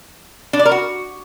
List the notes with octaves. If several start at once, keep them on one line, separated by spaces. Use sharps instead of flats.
D4
D5
A#4
F#4